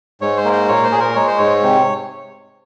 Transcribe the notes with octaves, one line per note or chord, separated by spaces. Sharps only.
G#2 C#5
C5
A#3
C5
A#2 C#5
C5
A#2 G#4
A#4
G#3 C#5
C5
G#2 C#5
C3